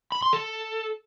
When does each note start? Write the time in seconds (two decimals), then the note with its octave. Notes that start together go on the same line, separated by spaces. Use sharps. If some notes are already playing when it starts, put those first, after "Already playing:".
0.12 B5
0.22 C6
0.33 A4